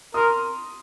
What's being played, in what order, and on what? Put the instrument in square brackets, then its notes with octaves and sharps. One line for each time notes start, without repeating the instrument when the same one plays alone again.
[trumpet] A#4 [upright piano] C6 D#6